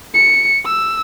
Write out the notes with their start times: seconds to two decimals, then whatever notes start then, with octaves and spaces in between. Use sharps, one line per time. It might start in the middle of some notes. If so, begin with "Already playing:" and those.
0.14 C#7
0.66 E6